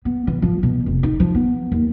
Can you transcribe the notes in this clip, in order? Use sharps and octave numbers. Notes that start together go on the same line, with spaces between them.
B3
E3
F3
B2
F1
D#4
F3
B3
D#2